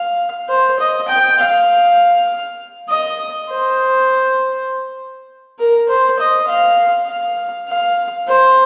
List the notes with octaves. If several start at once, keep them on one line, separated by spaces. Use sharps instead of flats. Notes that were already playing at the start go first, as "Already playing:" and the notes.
Already playing: F5
C5
D#5
G5
F5
D#5
C5
A#4
C5
D#5
F5
F5
F5
C5